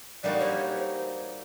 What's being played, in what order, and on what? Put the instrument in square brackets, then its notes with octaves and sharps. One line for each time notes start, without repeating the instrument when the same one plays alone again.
[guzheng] G3 A#3 D#4 F#4 [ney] D5
[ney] C#5
C#5
C5